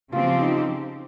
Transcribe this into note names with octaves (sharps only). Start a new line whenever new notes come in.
C#3 F3 C4 F4 G4
F4
D#4